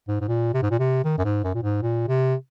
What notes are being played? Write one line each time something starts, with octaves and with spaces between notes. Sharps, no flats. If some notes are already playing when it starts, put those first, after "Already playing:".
G#2
G#2
A#2
C3
G#2
A#2
C3
D#3
F#2
G#2
F#2
A#2
G#2
A#2
C3